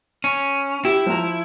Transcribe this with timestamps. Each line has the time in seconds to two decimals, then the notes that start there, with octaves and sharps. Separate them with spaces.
0.24 C#4
0.85 E4 G4
1.06 F3 A#5